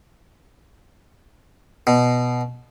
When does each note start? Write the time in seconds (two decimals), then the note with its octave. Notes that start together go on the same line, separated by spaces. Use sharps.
1.87 B2